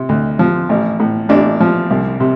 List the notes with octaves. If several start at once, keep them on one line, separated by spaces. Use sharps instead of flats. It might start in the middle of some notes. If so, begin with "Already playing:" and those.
Already playing: C3
D2
F3
A1
A2
A1 D4
F3
C2
C3